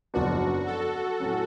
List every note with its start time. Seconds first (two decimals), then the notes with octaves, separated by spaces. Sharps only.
0.14 F#1 F#2 F3 B3 D4 F#4
0.66 A4
1.20 A2 F#3 C#4